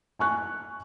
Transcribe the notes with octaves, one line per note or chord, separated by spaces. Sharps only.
G#5 C#6 F#6